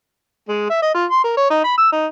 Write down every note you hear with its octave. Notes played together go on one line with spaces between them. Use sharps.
G#3
E5
D#5
F4
C6
A#4
C#5
D#4
B5
E6
D#4